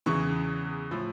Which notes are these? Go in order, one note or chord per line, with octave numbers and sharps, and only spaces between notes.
E2 C#3 E3 C#6
A2 F3